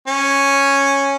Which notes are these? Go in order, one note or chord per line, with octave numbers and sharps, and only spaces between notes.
C#4